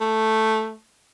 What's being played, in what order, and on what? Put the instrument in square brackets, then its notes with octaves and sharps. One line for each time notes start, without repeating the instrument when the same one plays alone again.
[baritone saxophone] A3